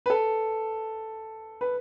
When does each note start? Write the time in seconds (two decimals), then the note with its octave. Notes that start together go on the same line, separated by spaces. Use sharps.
0.06 B4
0.10 A4
1.61 B4